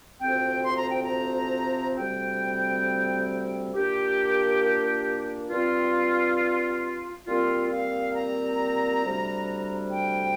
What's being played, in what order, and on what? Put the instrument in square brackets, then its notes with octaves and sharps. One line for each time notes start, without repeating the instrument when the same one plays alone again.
[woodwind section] D2 C3 F3 C4 G5
C6
A#5
G5
A#5
D2 C3 G3 C4 G5
A#2 A#3 D4 G4
G2 G3 C4 F4
A#2 G3 C4 F4
F5
A#5
D2 C3 G3 D4
G5